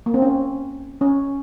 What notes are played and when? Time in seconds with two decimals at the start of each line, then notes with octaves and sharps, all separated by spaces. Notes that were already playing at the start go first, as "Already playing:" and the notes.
0.06 A#3
0.14 C4
0.22 C#4
1.01 C#4